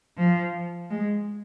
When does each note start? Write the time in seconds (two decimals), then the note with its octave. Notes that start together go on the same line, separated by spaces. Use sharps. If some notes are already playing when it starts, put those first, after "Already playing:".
0.18 F3
0.90 G#3